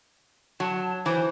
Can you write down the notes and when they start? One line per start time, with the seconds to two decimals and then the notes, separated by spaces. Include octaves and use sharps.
0.60 F#3 A5
1.06 E3 C5